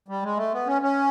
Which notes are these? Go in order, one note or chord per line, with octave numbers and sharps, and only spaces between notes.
G3
G#3
A3
B3
C#4
C#4